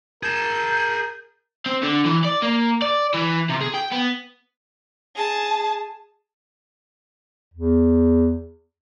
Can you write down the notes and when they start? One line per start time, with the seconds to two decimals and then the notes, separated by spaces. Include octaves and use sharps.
0.23 G#4 A#4 A5 G6
1.66 C4
1.83 D3
2.05 E3
2.24 D5
2.42 A#3
2.82 D5
3.14 E3
3.49 C3
3.61 G#4
3.74 G5
3.91 B3
5.16 G#4 A5
7.54 E2